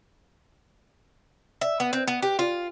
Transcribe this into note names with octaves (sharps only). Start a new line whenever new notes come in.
E5
B3
C4
B3
G4
F4